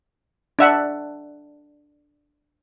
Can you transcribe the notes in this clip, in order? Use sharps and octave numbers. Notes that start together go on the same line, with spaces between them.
D4 E5 F#5